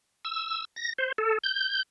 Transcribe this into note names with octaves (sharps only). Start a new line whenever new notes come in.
E6
A#6
C5
A4
G6